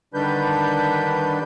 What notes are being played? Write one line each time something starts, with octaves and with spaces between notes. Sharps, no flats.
D3 D#3 G3 D4 B4 G6